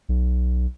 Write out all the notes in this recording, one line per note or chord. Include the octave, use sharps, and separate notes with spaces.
B1